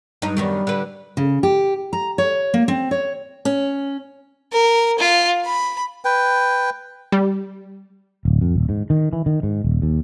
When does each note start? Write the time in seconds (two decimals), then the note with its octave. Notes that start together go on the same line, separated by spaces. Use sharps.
0.22 G2 D#4
0.37 F#2 D#3 G3 B3
0.67 D3 B4
1.17 C#3
1.43 G4
1.93 A#5
2.18 C#5
2.54 A#3
2.68 C4
2.91 C#5
3.45 C#4
4.52 A#4
4.99 F4
5.45 B5
6.05 B4 G5
7.12 G3
8.25 D1
8.41 F2
8.56 D#1
8.69 G#2
8.90 D#3
9.13 E3
9.26 D#3
9.43 G#2
9.64 D#1
9.82 D#2